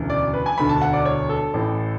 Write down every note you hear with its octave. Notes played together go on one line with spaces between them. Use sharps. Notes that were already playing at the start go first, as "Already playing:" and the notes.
Already playing: E1 D2 C#3 E3
D5
B4
G#5
E1 D2 D3 B5
A5
F#5
D5
C#5
A4
A1 A2 E3